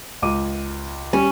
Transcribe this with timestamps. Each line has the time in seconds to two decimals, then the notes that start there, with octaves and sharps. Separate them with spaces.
0.22 C#2 D6 D#7
1.13 G3 C#4